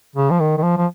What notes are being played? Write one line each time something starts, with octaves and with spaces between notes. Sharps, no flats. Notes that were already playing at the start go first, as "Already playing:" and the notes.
C#3
F3
D#3
D#3
F3
F3